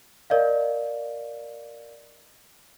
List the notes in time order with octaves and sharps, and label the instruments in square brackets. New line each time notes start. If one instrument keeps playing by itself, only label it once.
[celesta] A#4 D5 D#5 F5